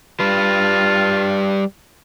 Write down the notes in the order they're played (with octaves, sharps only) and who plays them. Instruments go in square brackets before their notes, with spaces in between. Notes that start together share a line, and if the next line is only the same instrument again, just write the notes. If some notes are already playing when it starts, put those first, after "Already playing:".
[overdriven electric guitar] G3 B4 [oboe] F4